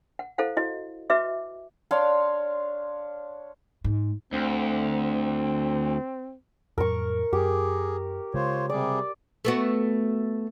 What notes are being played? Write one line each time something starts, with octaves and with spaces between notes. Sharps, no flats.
F#5
E4 A4 C5 F5 F#5
E4 F#4 D#5
F#4 B4 D#5 E5 D6
D4 C#5 F5 C6
G#2
D2 C4
F2 A2 F#3 A#4 C#6
F#2 G4 G#4
C#3 G#3 F4 C5 C#5
C3 G3 G#4 D5
A3 B3 F#4